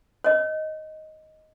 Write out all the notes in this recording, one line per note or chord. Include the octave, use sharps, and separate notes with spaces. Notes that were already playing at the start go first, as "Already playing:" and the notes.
C#5 D#5